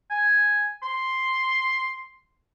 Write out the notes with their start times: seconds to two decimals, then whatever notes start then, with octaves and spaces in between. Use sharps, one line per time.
0.11 G#5
0.83 C6